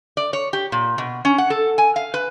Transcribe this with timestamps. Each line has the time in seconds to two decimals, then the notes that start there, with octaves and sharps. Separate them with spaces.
0.17 D5
0.33 C#5
0.53 G4
0.72 A#2
0.98 B2
1.25 C#4
1.38 F#5
1.50 A4
1.78 G#5
1.96 F5
2.14 B4